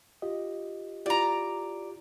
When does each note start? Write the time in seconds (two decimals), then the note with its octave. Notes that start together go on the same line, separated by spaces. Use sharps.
0.22 F4 G4 D#5
1.06 E4 F4 G4 D5 A#5